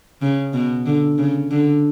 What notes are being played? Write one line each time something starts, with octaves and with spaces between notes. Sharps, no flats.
C#3
B2
D3
C#3
D3